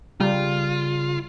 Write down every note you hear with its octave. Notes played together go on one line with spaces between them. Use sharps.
C#3 G3 F4